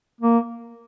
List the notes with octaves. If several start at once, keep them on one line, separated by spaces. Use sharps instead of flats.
A#3